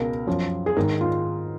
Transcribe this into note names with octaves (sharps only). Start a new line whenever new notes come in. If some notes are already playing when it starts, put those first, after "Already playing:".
Already playing: C#2 B2 A#4
F#2 F3
G#4
G#2 D#3 A#4
F4